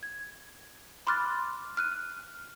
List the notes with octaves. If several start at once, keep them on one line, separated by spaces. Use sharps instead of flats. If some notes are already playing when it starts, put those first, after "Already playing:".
G#6
B5 C6 D6 F6 F#6 A6
F6 F#6 D#7